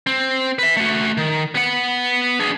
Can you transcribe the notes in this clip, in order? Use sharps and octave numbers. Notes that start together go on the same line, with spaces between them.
C4
B4 E5
A3 F#4
D#3
B3 F#5
D4 G#4